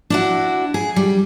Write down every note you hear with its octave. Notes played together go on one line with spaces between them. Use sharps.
D4 E4 F#4
G#4
G3